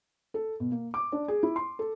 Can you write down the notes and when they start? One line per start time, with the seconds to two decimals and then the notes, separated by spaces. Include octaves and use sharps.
0.34 A4
0.60 B2
0.71 A#3
0.94 D6
1.12 D4
1.28 G#4
1.43 E4
1.56 C6
1.79 A4